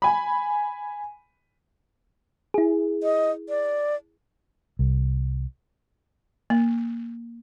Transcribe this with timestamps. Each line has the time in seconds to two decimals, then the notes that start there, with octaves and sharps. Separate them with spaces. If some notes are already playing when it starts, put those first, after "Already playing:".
0.02 G#5 B5
2.54 E4 G#4
3.03 D#5
3.49 D5
4.79 C2
6.50 A#3